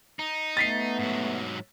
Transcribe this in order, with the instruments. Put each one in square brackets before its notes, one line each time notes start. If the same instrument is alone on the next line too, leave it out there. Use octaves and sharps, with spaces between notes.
[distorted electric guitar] D#4
[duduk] A3 [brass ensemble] B3 [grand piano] A6 B6 C7
[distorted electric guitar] G#2 F#3